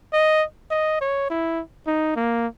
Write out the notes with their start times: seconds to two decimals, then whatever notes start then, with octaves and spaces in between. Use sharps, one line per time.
0.13 D#5
0.71 D#5
1.01 C#5
1.30 E4
1.87 D#4
2.16 A#3